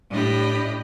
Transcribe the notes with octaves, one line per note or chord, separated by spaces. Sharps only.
A2 D4 G4 D#5 B5